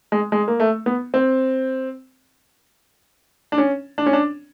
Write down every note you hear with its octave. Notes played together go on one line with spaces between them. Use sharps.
G#3
G#3
A#3
A3
B3
C4
D4
C#4
D4
C#4
D4